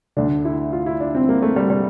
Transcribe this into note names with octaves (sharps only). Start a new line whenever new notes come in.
D2 D3 D4
E4
F4
E4
D4
C4
A#3
A3
G3
G3